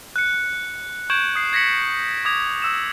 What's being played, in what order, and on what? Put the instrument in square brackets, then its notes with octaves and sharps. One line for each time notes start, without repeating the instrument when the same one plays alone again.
[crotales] F#6 C#7
C#6 G6 G#6 D7 E7 F#7
D#6 C7
G#6 A#6 B6 C#7 F#7
D6 D#6 G#6 F7
D#6 E6 E7